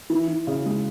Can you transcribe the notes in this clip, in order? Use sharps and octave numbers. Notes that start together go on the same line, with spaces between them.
E3
E3
C#3
G#3